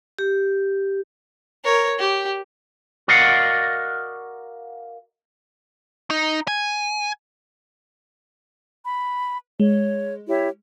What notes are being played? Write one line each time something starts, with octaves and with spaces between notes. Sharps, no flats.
G4
A#4 C#5
G4
F#4 A#4 D5 D#5 F5 F#5
D#4
G#5
B5
G#3 C#5
E4 G4 C#5